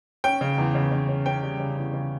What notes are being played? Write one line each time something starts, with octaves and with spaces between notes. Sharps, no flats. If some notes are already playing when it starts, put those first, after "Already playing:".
C#4 G5
C#3
E2
C#3
C#3
C#4
C#4 G5
G3
C#3
E2
C#3